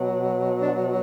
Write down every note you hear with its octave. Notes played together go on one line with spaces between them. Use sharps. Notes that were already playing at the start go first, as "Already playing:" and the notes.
Already playing: B2 F#3
D4